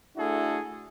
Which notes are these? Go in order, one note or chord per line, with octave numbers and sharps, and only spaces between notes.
A3 D4 E4 F#4 G#4 A4